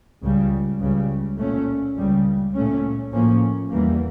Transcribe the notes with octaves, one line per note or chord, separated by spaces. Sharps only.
C#2 C#3 G3
C#2 C#3 G3
A#2 A3 C#4
C#2 C#3 G3
A#2 A3 C#4
A2 F3 A#3 C#4
E2 E3 G3 A#3